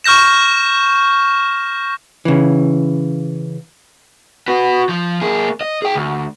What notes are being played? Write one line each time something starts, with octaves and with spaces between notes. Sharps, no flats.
C#6 F6 G6 A#6 E7
C#3 E3
F#4 B4
F3
A#3 G#4
D#5
G#4 G5
D2